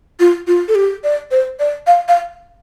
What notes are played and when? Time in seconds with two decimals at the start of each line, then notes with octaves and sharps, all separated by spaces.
0.20 F4
0.47 F4
0.68 A4
0.75 G4
1.04 D5
1.31 C5
1.59 D5
1.87 F5
2.08 F5